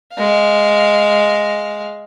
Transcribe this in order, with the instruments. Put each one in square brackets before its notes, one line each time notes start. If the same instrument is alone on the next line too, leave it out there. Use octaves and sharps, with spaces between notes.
[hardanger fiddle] G#3 F5